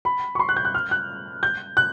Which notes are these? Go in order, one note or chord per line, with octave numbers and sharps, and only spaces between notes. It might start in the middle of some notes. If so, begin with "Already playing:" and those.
B5
C#6
C6
F#6
G6
F#6
F6
F#6
G6
F#6